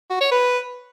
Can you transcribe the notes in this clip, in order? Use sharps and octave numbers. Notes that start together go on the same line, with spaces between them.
F#4
C#5
B4